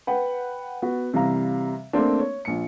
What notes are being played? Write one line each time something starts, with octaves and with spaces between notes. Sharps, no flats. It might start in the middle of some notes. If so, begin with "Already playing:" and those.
B4 F#5 G5
B3 F#4
C3 E3 G3 F5 A#5
A3 A#3 C4 D4
C#5
A#1 C#7